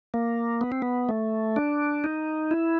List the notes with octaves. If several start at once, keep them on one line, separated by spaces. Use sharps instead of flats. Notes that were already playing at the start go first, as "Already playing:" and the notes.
A#3
B3
C4
B3
A3
D4
D#4
E4